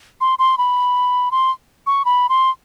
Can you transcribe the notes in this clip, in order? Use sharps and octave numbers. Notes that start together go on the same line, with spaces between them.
C6
C6
B5
C6
C#6
B5
C6